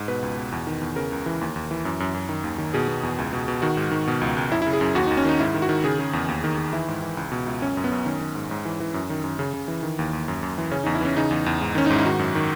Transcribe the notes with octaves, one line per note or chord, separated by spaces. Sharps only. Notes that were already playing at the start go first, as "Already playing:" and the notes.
Already playing: G#2
B2 B4
C#2
B2
E2
D#3
E2
C#3 A#4
C#2
E3
D#2
D#2
E3
F#2
F#2
F#2
D#3
D#2
D#3
B2 G#4
B2
E2
C#2
B2
B2
D#3 F#4
G#2
D#3
B2
C#2
C#2
F#2 E4
C#3 E4
G#4
F#2
D#2 F#4
D#2 D#4
C#4
D#3 D#4
G#2 E4
D#3
F#4
D#3
C#3 G#4
C#3
E2
D#2
D#3
D#3
E3 E4
G#2
E3
C#2
B2
C#2
F#2 C#4
F#2
B3
F#2
D#3 C#4
D#3
G#2
G#2
E3
E3
F#2
D#3
F#2
C#3
C#3
E3
D#3
D#2
D#2
F#2
F#2
E3
C#3 C#4
E2 D#4
E4
E3 C#4
C#3 D#4
E2
E2
G#2
D#3 C#4
D#4
G#2
E4
D#3 F#4
F#2
D#3